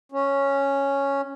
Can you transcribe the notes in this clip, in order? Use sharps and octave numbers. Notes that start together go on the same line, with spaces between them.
C#4